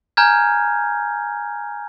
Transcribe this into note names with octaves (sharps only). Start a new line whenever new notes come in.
G#5 A#5 F6 G6 G#6